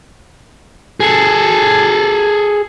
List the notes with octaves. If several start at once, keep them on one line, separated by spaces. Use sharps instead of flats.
G#4 A4